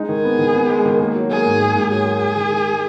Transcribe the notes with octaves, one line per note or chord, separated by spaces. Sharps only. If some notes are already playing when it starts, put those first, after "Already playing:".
Already playing: G#3 D#4
D#3 G#4
B3
D#3
B3
G#3
D#3
A#3
F#3
A#3 G#4
G#2
A#3
G#2
F#3 G#4
A#3
G#3
D#3
D#3
G#3